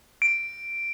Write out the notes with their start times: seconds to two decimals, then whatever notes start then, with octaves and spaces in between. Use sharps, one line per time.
0.22 D7